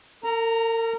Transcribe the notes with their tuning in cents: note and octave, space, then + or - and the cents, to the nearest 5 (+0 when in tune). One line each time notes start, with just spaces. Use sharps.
A#4 -40 A#5 +0